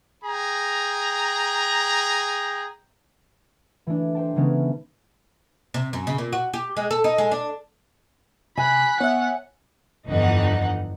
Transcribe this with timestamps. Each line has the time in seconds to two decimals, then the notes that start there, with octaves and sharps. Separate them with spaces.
0.24 G#4 G5 A#5
3.87 E3 A3 D4
4.15 C5 G5 A5
4.36 C#3 E3 G#3 B3 C#4 D#4
5.74 C3
5.93 F#2
6.07 C#3
6.18 A#2
6.33 F#4
6.53 G4
6.77 G#3
6.91 A4
7.04 D#4
7.18 G#3
7.32 D4
8.57 C3 G#5 B5 F#6
9.00 B3 C#5 E5 F#5
10.07 G1 F2 D3 E3 D#4 F#5